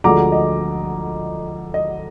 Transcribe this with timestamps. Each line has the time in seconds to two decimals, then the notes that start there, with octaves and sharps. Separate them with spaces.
0.04 D2 D3 F3 G#3 A#5 D6
0.32 D#5
1.74 D#5